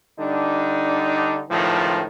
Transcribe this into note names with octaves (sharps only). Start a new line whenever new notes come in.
D3 G3 D4 D#4
C#2 A2 D#3 F3